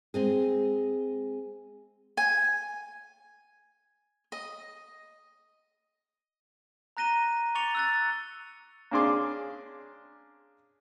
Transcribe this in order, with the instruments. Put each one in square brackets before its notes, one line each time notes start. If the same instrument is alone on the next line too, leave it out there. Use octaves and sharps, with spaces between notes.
[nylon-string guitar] G#3 C4 G#4
[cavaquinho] G#5
D#5
[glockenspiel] A#5 F#6 A#6 D#7 G7
C#6 D6 A6 C#7 F7 G7
E6 F#6 A6
[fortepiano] A#3 C#4 D4 G#4 C6 D6